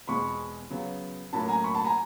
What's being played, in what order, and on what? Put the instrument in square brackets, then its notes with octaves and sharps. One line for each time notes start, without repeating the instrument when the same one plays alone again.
[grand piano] E2 B2 G#3 C4 B5 C#6
C#3 F#3 B3
A2 F#3 A#3 C#4 A5 B5
G#5 A#5
B5 C#6
A5 B5
G#5 A#5